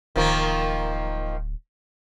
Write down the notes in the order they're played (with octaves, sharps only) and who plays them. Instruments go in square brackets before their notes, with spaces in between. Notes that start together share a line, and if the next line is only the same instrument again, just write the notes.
[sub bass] D1 [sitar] D#3 F3 A#3